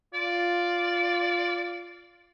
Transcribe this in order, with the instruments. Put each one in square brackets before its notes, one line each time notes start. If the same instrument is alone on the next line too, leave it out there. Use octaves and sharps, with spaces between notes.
[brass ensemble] F4 [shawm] D5